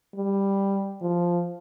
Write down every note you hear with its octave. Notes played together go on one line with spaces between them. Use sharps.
G3
F3